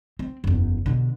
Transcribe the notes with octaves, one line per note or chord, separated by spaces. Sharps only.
C4
F#1 E2
B2 D3